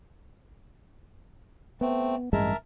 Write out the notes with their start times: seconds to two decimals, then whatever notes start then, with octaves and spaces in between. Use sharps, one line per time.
1.81 A3 B3 C4
2.33 A1 G2 G#3 A#4 E5 A5